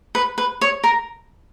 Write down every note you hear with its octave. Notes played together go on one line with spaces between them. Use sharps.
B4
B4
C#5
A#4